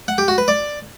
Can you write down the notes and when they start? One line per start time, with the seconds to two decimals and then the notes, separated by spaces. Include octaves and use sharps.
0.08 F#5
0.18 G4
0.28 F#4
0.38 B4
0.48 D5